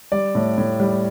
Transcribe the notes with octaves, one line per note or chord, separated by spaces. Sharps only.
G3 D5
A2
A2
G3